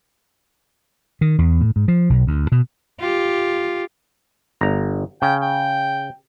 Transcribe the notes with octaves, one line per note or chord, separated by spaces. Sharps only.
D#3
E2
A2
G#2
F3
B1
D2
B2
F4 G4
G1 A#5
C#3 G5
G5